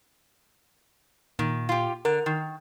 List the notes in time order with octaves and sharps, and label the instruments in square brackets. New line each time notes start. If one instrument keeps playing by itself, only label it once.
[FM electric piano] A#2 [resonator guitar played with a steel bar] D#3
[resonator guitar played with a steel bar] F4 G4
[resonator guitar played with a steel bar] D3 [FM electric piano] A#4
[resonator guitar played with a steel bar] D#3